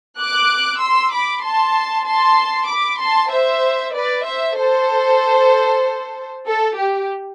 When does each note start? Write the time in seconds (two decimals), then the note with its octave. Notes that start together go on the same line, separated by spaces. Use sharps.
0.19 D6 F#6
0.82 C6 E6
1.13 B5 D6
1.44 A5 C6
2.07 A5 C6
2.69 B5 D6
3.00 A5 C6
3.31 C5 E5
3.95 B4 D5
4.26 C5 E5
4.57 A4 C5
6.45 A4
6.76 G4